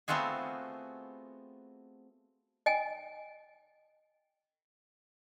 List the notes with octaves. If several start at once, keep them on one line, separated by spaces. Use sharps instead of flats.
A3 B3 C4 F4 F#4 G#4
D#5 G5 G#5